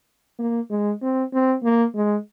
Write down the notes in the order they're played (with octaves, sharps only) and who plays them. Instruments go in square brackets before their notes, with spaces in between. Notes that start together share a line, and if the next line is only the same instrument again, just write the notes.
[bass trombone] A#3
G#3
C4
C4
A#3
G#3